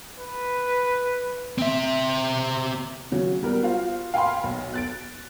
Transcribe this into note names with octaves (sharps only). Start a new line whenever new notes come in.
B4
C4 E5
C#3 F#3
G3 B3 A#4
F4 F#4 C5 F5
F5 G5 G#5 B5 C6
B1
F#6 A6 D7